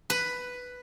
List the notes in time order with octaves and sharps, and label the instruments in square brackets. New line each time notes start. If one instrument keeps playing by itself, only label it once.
[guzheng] B4